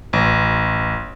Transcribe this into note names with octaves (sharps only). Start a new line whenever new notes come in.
A1